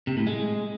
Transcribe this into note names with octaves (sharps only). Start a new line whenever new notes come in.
C3
A2
G#3